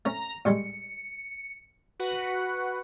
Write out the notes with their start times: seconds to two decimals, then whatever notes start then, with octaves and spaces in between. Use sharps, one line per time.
0.05 A3 C#4 A#5
0.45 A2 G3 G#3 C#7
2.00 F#4 B4 F#5